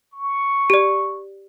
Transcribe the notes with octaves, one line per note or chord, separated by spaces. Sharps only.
C#6
G4 D5